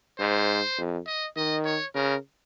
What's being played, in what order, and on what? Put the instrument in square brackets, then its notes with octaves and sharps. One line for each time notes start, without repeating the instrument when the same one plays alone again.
[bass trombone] G#2 [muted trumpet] C5
[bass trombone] F2
[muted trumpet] D#5
[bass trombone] D#3 [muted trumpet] D#5
[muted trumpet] C#5
[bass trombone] C#3 [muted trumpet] A#4